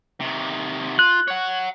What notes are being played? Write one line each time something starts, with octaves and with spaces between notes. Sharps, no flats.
C3 D#3
F4 F#6
C#5 F#5